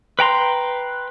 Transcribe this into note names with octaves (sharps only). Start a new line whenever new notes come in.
B4 G5 A#5 C6